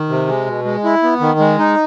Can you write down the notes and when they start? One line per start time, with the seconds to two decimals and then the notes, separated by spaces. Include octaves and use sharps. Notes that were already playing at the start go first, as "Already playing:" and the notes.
Already playing: D#3
0.09 C3
0.27 G#3
0.46 B2
0.65 G#3
0.84 E4
1.03 B3
1.20 D#3
1.39 G#3
1.59 D#4